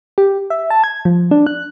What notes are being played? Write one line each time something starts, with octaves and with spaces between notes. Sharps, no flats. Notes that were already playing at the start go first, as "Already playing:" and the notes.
G4
E5
A5
G#6
F3
D4
F#6